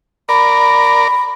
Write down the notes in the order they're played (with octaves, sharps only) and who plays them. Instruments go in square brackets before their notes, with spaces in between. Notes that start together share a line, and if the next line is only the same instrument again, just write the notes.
[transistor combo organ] A#4 D5 [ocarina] B5